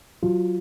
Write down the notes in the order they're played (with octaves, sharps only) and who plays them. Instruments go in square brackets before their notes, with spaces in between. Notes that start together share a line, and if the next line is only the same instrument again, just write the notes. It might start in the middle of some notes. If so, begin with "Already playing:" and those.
[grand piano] F#3 [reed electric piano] F4